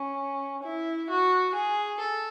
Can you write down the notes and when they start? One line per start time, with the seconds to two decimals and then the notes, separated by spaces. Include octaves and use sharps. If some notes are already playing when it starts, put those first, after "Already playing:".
Already playing: C#4
0.63 E4
1.09 F#4
1.54 G#4
2.00 A4